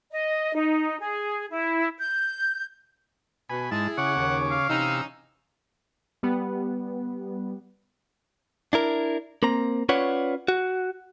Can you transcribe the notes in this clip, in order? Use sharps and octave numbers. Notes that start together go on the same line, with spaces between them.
D#5
D#4
G#4
E4
G6
B2 G#5 B5
G#2 G#3 E4 G#4 A5
C#3 C#5 F#5 D6
D#2
F5
C3 E3 C#4 D#4 E6
G3 B3
D4 E4 A#4
A#3 C4 A#5
C#4 F4 B4 C#5 D5 F#5
F#4